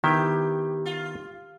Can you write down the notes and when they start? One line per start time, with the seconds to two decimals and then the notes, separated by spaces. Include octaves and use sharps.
0.04 D#3 B3 E4 G4
0.86 F4